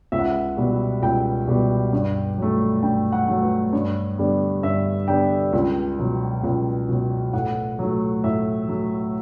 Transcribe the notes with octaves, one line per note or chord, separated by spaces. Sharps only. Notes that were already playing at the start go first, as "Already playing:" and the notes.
C#2 E5
F#5
E5
B2 G3 B3
C#2 G5
B2 G3 B3
G2
F#3 A3
G2 G5
F#5
F#3 A3
B4
G2 C#5
D3 G3 B3
G2 E5
D3 G3 B3 G5
C#2
B2 F#3
C#2
B2 F#3
A2 F#5
F#3 A3
A2 E5
F#3 A3